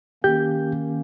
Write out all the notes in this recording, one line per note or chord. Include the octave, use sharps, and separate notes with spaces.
D#3 A#3 C#4 G4 G6